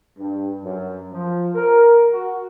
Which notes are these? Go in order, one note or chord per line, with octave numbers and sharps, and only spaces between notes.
G2
F#2
F3
A#4
F#4